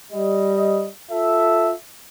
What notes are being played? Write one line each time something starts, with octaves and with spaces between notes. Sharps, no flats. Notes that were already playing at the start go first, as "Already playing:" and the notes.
G3 D#5
F4 A4 E5